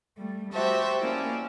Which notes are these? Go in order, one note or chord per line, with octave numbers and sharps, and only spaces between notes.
G3 A3
F#4 G4 C5 E5 A5
A#3 C#4 E4 D5